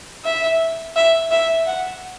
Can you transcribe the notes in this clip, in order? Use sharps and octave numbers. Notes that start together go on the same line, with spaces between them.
E5
E5
E5
F#5